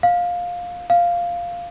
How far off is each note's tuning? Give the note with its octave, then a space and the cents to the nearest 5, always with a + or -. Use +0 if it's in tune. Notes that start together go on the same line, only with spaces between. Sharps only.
F5 +15
F5 -5